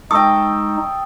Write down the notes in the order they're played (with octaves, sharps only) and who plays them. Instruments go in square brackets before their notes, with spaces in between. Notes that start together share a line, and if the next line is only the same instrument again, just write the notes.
[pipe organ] G#3 D#4 [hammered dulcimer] A4 G5 [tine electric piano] D#5 C#6 [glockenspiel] D#6